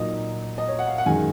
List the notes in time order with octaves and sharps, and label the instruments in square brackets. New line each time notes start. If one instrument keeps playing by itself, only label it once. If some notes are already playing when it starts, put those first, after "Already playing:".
Already playing: [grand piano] A#2 F#3 A#3 D#4 D#5
D#5
C#5
F#5
F5
F#5
F#2 D#3 G#3 G#5